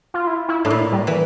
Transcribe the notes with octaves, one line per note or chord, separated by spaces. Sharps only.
F4
E4
E4
A2 D4
A#2 E4
G3
E3